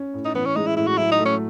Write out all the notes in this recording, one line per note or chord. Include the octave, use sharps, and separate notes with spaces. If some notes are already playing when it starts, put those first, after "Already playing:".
Already playing: C#4
A2
D#4
E3 B3
C#4
G#3 D#4
E4
A2 E4
F#4
F#3 E4
D#4
A3
C#4